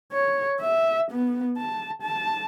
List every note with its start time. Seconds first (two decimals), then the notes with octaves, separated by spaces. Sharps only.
0.12 C#5
0.61 E5
1.12 B3
1.57 A5
2.02 A5